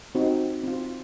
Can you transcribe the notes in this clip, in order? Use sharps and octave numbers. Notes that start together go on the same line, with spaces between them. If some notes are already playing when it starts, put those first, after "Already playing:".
C4 D#4 F#4
C4 F4